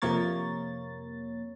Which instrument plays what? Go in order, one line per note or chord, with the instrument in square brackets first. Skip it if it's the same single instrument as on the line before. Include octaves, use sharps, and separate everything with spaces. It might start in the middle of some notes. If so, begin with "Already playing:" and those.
[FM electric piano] F2 C3 A#3 A#4 C#5 A6